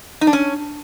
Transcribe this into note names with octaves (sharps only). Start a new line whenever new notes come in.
D#4
D4
C#4